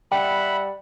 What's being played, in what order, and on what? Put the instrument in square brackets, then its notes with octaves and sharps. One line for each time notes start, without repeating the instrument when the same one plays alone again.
[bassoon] G3 [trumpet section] E5 F#5 [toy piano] G5 [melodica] B5